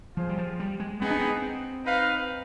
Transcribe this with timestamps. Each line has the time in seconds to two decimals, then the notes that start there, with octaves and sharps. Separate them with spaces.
0.17 F3 F4 G#4 C5
0.29 G3
0.38 F3
0.60 G3
0.80 G#3
1.01 B3 C4 D#4 G#4
1.11 D4
1.21 C4
1.86 D#4 B4 F5